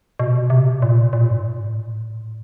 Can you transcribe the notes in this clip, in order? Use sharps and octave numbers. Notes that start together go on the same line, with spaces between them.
B2
C3
A#2
A#2
A2
G#2
A2